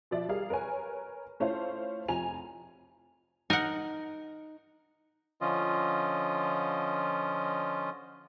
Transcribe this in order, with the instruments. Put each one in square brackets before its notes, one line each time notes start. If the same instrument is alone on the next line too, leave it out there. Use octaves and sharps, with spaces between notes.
[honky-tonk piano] B2 F3 D5 E5
G3 G4 G#4 A#4 F5
A#4 B4 C#5 G#5
A3 C#4 E4 F4 C5 F5
F1 F3 G#5 A#5 F7
[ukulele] D#4 [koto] A#4 F#5
[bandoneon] D3 F3 C#4 F4 D#5